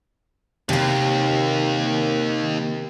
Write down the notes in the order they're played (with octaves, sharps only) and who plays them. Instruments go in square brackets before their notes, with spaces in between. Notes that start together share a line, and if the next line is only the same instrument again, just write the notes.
[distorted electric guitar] D#2 [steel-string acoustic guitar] C3 A#3